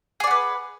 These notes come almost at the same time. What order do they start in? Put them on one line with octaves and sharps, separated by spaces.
G#4 D5 F#5 B4